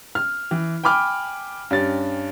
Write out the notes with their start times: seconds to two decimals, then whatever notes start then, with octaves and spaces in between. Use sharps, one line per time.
0.15 F6
0.51 E3
0.84 G5 G#5 B5 D6 F6
1.71 G2 C#4 A6